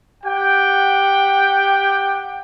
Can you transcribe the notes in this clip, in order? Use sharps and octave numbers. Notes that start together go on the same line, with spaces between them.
G4 F#5 G5